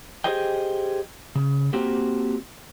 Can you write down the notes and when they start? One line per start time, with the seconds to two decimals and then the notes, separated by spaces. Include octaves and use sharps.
0.24 G4 G#4 C5 D#5 G5
1.35 C#3
1.73 A#3 C4 F#4 G4